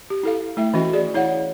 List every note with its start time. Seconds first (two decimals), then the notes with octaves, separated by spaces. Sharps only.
0.10 G4
0.23 E4 A4 F5
0.57 A3 E4 E5 G5
0.74 E3 C#4 F#4 D#5
0.93 G#4 D5
1.14 E4 C#5 F5 F#5